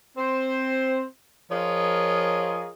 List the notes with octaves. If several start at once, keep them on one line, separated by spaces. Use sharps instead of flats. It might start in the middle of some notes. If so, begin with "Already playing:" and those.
C4 C5
F3 F4 G#4 A#4 C#5 D#5